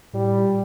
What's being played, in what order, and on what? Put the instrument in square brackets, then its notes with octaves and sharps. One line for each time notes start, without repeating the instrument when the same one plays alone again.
[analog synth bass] A2 [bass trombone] G3
[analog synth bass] A#2